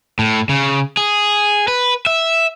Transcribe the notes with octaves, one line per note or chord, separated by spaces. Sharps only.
A2
C#3
G#4
B4
E5